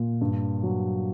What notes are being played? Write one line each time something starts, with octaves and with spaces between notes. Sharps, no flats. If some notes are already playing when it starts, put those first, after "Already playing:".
Already playing: A#2
G2
F#3